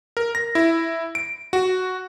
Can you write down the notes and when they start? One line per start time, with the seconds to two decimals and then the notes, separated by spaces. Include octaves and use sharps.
0.17 A#4
0.35 A#6
0.55 E4
1.15 D7
1.53 F#4